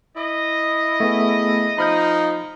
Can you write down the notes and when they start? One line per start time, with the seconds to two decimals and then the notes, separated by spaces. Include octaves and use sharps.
0.16 E4 D#5
1.00 A3 B3 G#4
1.78 F3 D#4 B5 F6 G6